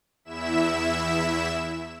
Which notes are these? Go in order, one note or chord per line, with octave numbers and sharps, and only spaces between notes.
E2 E4 E5 E7